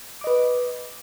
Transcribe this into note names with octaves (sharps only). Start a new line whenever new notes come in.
B4 D#5 D6